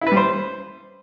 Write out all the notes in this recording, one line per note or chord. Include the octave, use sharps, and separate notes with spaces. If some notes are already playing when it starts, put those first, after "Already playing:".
E4
B4
G3
C5